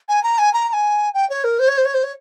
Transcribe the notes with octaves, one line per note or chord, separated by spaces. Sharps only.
G#5
A#5
G#5
A#5
A#5
G#5
G5
C#5
A#4
C5
C#5
C5
C#5
C5
C#5